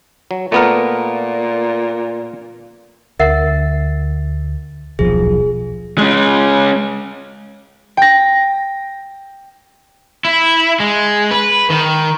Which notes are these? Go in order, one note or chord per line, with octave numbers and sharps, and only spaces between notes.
F#3
A#2 A3 B3 A#4
D2 A#4 E5 F#5 A6
D#1 B1 F3 G#4
G#3 C#4
G5 A#6
E4
G#3
B4
D#3